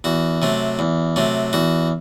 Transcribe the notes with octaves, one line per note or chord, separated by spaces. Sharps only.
E2 F#4
C3 F#3 A3
E2
C3 F#3 A3
E2 F#4